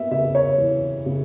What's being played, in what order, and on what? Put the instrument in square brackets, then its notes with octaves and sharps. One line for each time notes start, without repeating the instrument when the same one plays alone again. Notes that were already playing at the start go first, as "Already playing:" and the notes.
Already playing: [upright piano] B3 E5
C#3 E5
C#5
E3
C#3